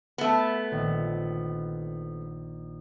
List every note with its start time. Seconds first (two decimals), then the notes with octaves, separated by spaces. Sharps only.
0.18 A3 B3
0.71 A#1 D#3